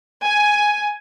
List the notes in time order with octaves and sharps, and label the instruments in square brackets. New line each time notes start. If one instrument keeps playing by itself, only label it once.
[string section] G#5